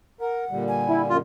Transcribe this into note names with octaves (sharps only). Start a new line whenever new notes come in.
A#4 F#5
A#2 D3 G3
G#5
E4
F#2 F4